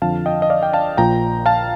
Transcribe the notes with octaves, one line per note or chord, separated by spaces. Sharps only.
F2 D3 F3 F5 A5
D#5 G5
D#5
D5 F5
G5
F5 A5
A#1 A#2 F3 G5 A#5
F5 A5